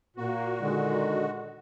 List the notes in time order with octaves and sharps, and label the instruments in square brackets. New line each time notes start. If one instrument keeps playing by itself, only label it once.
[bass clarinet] A#2 [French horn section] A#3 [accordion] F#4
[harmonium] D3 G#3 [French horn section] D#3